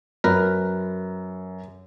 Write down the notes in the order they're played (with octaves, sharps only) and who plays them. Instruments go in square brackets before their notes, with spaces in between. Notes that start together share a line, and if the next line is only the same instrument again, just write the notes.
[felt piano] F#2 [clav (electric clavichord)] A#4 B4